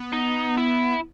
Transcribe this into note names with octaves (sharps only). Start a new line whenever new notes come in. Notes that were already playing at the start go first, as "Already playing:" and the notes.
Already playing: B3
D#4
E4